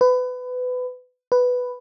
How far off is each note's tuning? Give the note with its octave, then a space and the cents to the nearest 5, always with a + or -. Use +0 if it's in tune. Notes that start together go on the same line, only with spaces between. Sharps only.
B4 +25
B4 +5